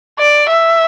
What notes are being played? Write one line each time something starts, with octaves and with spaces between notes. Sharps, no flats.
D5
E5